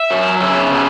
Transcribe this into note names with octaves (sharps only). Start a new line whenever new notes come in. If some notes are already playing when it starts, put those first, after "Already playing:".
Already playing: E5
F#3
C#3 E5
B3